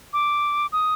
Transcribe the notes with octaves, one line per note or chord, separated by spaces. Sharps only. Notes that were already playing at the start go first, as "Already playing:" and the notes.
D6
D#6